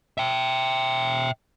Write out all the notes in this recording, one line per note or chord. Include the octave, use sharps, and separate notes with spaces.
E5 G5